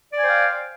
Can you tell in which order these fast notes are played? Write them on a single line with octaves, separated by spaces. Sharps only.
D5 G#5 C5 G5 F5